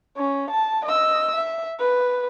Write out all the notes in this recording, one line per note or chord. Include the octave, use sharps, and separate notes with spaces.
C#4
A5
D#5 E6
E5
B4